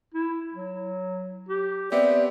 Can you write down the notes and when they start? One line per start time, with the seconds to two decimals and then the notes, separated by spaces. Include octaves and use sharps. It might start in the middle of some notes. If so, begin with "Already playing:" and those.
0.14 E4
0.53 F#3
1.49 G4
1.92 B3 C4 G4 D5 E5